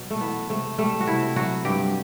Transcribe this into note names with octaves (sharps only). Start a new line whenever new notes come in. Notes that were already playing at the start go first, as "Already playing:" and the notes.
Already playing: B2 F#3
A3
E3 B3
C3 A3
G3 A3
F#4
C3 E4
F#3 F#4
G2 G4